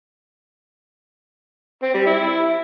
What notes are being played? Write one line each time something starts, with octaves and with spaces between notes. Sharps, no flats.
C4
G3
E4